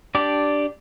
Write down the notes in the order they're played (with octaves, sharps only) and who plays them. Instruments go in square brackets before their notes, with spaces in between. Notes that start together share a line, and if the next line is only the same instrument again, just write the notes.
[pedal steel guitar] D4 G4 D5